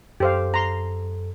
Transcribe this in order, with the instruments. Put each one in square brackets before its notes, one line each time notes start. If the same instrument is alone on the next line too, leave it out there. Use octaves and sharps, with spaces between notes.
[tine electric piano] F#2 A4 [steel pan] G4 C5 F5
[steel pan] A#5 C6